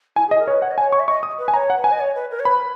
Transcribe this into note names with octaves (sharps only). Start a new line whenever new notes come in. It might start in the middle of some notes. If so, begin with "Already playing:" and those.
E4 G#5
G#4
D#5
A#4
C#5
B4
C#5 F#5
D#5
C#5 G#5
C#6
E5
D#5 C#6
D#6
B4
G#5
C#5 A#5
F#5
B4
G#5
D#5
C#5
B4
A#4
C#5
B4 B5